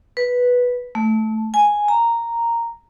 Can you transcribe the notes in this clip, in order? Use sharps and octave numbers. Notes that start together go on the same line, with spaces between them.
B4
A3
G#5
A#5